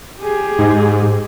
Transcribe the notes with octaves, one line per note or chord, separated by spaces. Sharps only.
G4 G#4
G#2